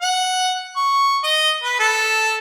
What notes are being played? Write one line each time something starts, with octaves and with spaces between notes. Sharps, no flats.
F#5
C#6
D#5
B4
A4